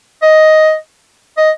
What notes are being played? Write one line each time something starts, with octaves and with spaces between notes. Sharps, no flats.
D#5
D#5